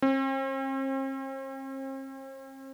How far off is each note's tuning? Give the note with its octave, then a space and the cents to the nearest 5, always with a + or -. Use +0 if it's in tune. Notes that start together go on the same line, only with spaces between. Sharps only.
C4 +45